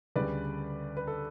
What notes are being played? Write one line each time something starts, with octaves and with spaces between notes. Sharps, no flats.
D2 C#3 G3 B4 D5
B4
A4